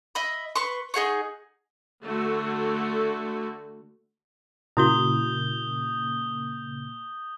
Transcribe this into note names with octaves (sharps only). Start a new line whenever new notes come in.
D#5 E5 B5
B4 C6 C#6
D#4 G#4 F#5 C#6
D3 A3 F#4
A#2 C#3 A#3 E4 F#4 D#6 G6 G7